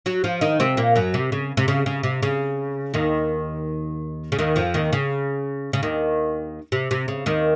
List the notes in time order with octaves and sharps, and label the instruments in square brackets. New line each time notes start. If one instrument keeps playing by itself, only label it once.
[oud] F#3 F#4
F3 F4
D#3 D#4
C3 C4
A#2 A#3
F#2 F#3
C3
C#3
C3
C#3
C#3
C3
C#3
D#2 D#3
C#3
D#2 D#3
F2 F3
D#2 D#3
C#3
C#3
D#2 D#3
C3
C3
C#3
D#2 D#3